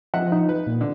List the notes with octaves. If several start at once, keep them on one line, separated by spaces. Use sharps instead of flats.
F3 D#5 E5 F#5
D#4
B4
A#2
D3